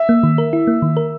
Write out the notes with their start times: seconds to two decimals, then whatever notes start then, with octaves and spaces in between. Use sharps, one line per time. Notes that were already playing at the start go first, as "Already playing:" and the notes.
Already playing: E5
0.09 A#3
0.23 D#3
0.38 A#4
0.53 E4
0.67 A#3
0.82 D#3
0.97 A#4